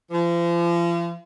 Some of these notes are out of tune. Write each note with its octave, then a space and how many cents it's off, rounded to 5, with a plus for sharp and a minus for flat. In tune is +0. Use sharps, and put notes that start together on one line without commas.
F3 -40